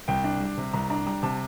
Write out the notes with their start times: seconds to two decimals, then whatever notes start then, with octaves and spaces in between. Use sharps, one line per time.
0.08 C2 G5
0.24 D4
0.41 G3
0.57 C3
0.73 C2 A#5
0.90 D4 A#5
1.06 G3 A#5
1.23 C3 A5